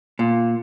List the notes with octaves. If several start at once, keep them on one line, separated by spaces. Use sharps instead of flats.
A#2